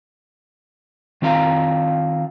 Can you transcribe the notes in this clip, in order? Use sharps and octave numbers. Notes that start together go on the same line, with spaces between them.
D#3 C4 F4 F5 A#5